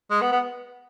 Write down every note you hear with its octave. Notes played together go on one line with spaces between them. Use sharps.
G#3
B3
B3